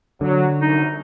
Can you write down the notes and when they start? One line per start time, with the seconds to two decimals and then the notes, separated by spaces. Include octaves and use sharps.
0.21 D3 F#3
0.61 C2 F#2 D#4